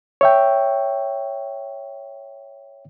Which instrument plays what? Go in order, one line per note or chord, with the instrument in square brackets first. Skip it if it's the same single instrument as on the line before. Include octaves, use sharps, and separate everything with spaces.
[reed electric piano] C#5 E5 G5